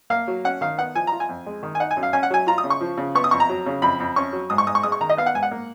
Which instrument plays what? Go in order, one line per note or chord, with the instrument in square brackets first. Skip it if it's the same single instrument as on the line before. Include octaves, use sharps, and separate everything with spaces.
[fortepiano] A#3 F5
F#3
C#4 F#5
D#3 F5
B3 F#5
F3 G#5
F4 A#5
G#5
F2
G#3
D#3
G#5
D#4 F#5
G#5
F#2
F5
C#4 G#5
F#5
F#3 G#5
F4 A#5
D#6
C#3
C#6
F3
C#3
B3 C#6
D#6
F2 C#6
A#5
F#3
C#3
F2 B5
F2
C#4 C#6
F#3
G#2 D#6
C#6
G#2 D#6
C#6
G#3 D#6
C#6
D#3 A#5
D#5
B3 F5
F#5
G#2 G#5
F#5
A#3